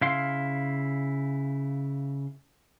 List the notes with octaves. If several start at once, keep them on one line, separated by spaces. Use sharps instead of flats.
C#3 E4 F5 C6